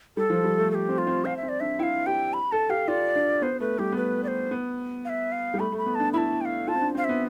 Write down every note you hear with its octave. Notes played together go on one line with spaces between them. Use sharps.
G3 A4
F3
G3
A3
A4
G4
C4
F4
C4
C4 F5
E5
C4
D5
D4 E5
E4 G5
F5
G4 G5
B5
A4 A5
G4 F5
F4 D5
D4
B3 C5
A3 B4
G3 G4
B3
A3 B4
D5
C5
B3
F5
E5
F5
G3
A3 B5
A3
B5
B3
D4 A5
E4 A5 B5
G5
F5
F4 A5
C4
D4
C4
F5
B3 E5